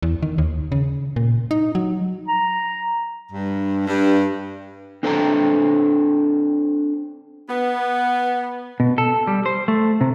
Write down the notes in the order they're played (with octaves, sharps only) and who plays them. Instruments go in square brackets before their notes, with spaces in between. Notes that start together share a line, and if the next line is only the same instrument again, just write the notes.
[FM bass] E2
D#3
D#2
C#3
A#2
D#4
F#3
[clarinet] A#5
[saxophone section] G2
G2
[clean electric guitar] C4 D4 A4 C5 G5 A#5
[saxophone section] B3
[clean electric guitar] B2
A4
G3
C5
A3
C3